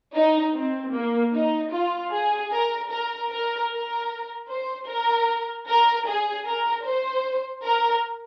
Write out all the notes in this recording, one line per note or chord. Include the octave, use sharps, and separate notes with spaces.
D#4
C4
A#3
D#4
F4
G#4
A#4
A#4
A#4
A#4
C5
A#4
A#4
G#4
A#4
C5
A#4